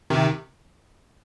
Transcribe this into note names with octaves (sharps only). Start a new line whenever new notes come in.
C3 D#3